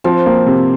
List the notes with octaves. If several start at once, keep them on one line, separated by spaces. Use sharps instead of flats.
F3 C4
A#3
C3